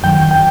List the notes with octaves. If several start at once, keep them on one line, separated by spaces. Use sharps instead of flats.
F#2 D#3 F#3 G5
G5